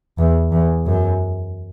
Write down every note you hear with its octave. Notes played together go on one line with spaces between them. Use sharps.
E2
E2
F#2